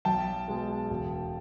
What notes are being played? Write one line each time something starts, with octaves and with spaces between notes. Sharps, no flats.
B1 G5 A5
B2 G#3
E1